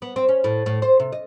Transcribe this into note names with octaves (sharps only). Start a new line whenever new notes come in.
B3
C4
C#4
A2
A2
C5
C3
D#5